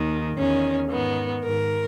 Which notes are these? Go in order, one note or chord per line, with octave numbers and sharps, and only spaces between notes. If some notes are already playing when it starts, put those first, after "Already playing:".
Already playing: D#2 D#3
E2 D#3 C#4
G#2 D#3 B3
G#2 D#3 A#4